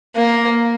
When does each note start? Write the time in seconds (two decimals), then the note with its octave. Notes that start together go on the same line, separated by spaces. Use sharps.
0.15 A#3